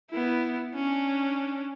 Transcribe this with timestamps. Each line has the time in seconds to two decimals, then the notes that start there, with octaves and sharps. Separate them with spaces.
0.10 B3 E4
0.75 C#4 D4